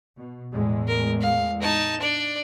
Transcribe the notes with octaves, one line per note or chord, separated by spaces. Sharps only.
B2
E2 A2 G#3
A#4
F5
D#4 A5
D4 D5